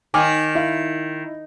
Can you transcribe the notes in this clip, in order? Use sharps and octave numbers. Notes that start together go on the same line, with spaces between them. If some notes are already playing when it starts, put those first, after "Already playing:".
D#3 G#5 D6 F6
E4 F5